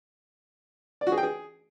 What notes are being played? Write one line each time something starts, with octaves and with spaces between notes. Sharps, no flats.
D5
F#4
G#4
G5
G#4